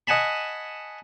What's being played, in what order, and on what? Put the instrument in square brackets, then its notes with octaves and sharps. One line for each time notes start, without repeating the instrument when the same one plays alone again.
[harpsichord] D#5 F#5 G#5 A5 B5